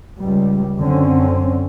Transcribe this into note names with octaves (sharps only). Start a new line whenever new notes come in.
C#2 G3
F#2 D3 C4 C#4